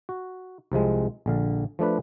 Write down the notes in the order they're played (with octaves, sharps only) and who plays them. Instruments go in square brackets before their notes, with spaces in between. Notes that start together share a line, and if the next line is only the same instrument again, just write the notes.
[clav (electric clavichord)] F#4
C2 C3 F3 G#3
A#1 D3 F5
F3 A3 D4 B4